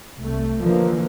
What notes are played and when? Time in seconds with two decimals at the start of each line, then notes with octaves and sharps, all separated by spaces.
0.19 C2 A3
0.60 D3 E3 F3 A#3